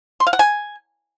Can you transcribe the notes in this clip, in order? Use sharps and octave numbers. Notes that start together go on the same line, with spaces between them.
C6
F5
F#5
G#5